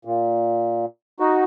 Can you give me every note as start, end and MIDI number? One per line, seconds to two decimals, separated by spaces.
0.05 0.86 46
1.20 1.44 63
1.20 1.44 66